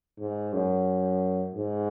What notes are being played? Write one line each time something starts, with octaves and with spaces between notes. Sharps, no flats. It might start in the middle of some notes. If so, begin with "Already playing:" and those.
G#2
F#2
G#2